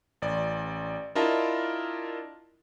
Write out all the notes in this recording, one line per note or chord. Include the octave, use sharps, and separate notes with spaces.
A1 D5
D4 E4 F4 A#4 D#5 A5